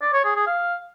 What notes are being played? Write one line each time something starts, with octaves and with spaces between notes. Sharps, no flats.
D5
C#5
G#4
G#4
F5